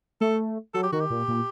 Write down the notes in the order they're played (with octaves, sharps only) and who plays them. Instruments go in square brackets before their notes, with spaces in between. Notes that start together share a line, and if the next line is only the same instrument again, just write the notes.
[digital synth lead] A3 [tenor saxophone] A4
[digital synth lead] F#3 [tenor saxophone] A4
[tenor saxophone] G4
[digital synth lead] D#3 [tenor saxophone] F#4
[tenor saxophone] G4
[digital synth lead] A#2
A#2